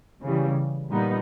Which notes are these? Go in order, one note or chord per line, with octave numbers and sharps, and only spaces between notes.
C#3 E3 G3
A#2 G3 B3 D#4